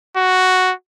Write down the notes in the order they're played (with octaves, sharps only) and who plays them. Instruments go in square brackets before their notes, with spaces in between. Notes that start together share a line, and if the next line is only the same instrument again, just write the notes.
[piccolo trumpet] F#4